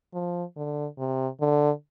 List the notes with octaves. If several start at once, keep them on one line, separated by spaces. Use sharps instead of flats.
F3
D3
C3
D3